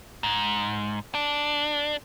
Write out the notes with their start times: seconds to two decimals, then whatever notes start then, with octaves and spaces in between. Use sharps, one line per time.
0.23 G#2
1.14 D4